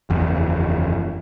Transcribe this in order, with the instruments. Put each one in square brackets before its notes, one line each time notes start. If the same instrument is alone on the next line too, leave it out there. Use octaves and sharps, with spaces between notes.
[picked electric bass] F#1 E2